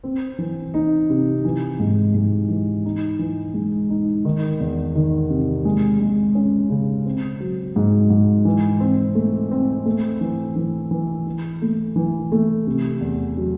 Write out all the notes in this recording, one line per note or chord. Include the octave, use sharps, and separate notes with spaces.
C4
E3
D#4
C3
E3
G#2
G#2
E3
D#4
E3
G#3
D#4
D#3
E2
D#3
C3
G#3
G#3
C#4
C#3
C4
F#3
G#2
G#2
E3
C4
A3
C4
A3
E3
E3
E3
E3
A3
E3
A3
C3
E2
F#3